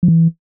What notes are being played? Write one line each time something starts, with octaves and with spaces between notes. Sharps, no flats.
F3
E3